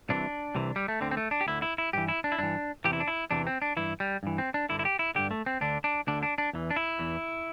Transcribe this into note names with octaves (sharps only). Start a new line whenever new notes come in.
C2 C3 E3 D4
C2 C3 E3
G3
A3
D2 D3 C4
C4
A3
D4
G4
D2 D3 E4
E4
E4
G2 E3 G4
E4
D4
E4
G2 E3 D4
E2 C3 E3 G4
E4
D4
E4
E2 C3 E3 D4
C4
D4
G2 E3 E4
G3
G2 E3
C4
D4
G2 D3 E4
E4
G4
E4
G2 D3 G4
A3
C4
D2 D3 D4
D4
D2 D3 D4
D4
D4
E2 E3
D4
E4
E2 E3